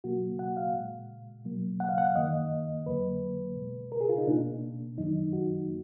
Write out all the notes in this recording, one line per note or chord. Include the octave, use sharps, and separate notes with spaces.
B2 F#3 A#3 F#4
F#5
F5
A#2 G#3
B2 F#3 A#3
F#5
F5
F#5
F5
F#2 D#3 A#3 D#5
F2 D3 F#3 A#3 B4
B2 G#3
A#4
G#4
F4
D#4
B2 A#3 D4
F#2 D#3 F#3 D#4
F#4
A#3